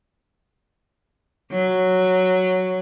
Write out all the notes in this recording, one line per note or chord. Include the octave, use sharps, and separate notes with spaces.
F#3